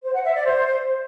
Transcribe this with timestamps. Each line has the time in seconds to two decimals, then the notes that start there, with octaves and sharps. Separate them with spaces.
0.03 C5
0.13 F#5
0.24 E5
0.34 D5
0.44 C5